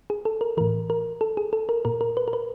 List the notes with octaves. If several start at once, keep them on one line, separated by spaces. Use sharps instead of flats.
G#4
A4
A#4
A2 E3 A#4
A#4
A4
G#4
A4
A#4
A#2 A#4
A#4
B4
A#4
B4